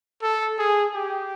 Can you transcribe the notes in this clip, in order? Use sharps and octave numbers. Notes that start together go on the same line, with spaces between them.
A4
G#4
G4